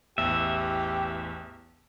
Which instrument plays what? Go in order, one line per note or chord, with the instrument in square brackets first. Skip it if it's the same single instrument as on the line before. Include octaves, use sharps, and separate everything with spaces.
[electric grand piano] A1 E2 [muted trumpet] G4 [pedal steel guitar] E5